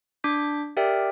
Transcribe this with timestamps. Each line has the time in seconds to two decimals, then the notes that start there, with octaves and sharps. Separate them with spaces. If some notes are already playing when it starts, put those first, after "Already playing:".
0.24 D4 D6 G6 B6
0.77 G4 A#4 D5 E5 G5